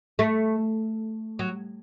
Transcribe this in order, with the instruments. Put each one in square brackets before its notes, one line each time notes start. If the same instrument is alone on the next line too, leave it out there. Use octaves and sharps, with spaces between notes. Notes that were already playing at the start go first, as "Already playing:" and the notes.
[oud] A3
F#3